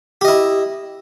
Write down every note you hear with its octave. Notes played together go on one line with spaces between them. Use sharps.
E4 G4 D#5